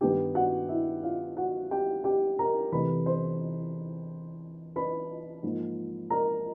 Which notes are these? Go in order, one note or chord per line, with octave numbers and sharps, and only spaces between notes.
G2 D#3 G3 B3 G4 G5
F#4 F#5
E4 E5
F4 F5
F#4 F#5
G4 G5
G4 G5
A#4 A#5
E2 C3 E3 A3 B4 B5
C5 C6
B4 B5
G#2 F3 A#3
A#4 A#5